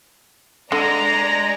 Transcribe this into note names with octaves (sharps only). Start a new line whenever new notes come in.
D3 G#3 D5 A#5 A#6